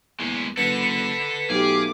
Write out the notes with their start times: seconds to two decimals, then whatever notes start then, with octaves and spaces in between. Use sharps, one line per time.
0.20 E2 G#3 A#3
0.57 F#1 A4 B4 F#5 A#6 B6
1.50 B1 A3 G4 G#4 F5 D6